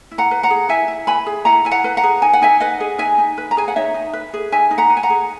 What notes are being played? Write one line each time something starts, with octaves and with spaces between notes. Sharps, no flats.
E4
F#5 A#5
B4
F#5 A#5
G#4
E4 E5 G#5
E4
B4 G#5 B5
G#4
E4 F#5 A#5
E4 G#5
F#5 A#5
B4
F#5 A#5
G#4
D#4 G#5
F#5
D#4 E5 G#5
B4 D#5 F#5
G#4
D#4 E5 G#5
D#4
B4
A#5
G#4 G#5
F#5
D#4 C#5 E5
D#4
B4
G#4
D#4 E5 G#5
D#4
F#5 A#5
B4
G#5
F#5 A#5
G#4